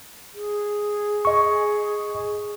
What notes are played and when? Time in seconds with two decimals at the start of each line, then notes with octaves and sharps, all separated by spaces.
0.35 G#4
1.25 D#5 C#6